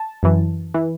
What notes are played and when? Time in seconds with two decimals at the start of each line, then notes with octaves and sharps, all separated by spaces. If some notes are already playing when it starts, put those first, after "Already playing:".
Already playing: A5
0.23 F#2 E3
0.74 E3